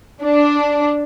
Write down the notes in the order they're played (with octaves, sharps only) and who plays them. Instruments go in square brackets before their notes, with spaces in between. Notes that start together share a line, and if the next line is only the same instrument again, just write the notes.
[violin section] D4